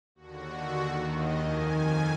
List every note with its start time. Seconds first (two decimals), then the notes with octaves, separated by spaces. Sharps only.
0.15 D#2 D3 F#4
0.77 D#2 D#3 F#4
1.08 D#5
1.39 F2 D#3 G#5